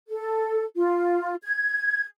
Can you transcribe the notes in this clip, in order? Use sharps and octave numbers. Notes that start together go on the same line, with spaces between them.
A4
F4
G#6